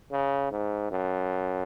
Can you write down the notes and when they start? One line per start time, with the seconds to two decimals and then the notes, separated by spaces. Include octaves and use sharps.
0.12 C#3
0.51 G#2
0.91 F#2